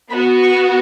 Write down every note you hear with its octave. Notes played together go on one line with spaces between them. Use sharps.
B3 F#4 B5
C#6